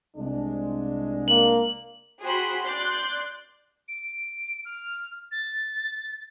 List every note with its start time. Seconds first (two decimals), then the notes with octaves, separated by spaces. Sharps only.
0.16 C2 G#3 D4
1.28 A#3 F#7
2.22 F#4 G#4 C5 G5 B5
2.64 D5 C6 F#6 G6
3.88 D7
4.65 F6
5.31 A6